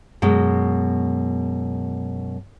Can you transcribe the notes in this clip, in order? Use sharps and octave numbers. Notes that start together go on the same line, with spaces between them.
F#2 B2 G#3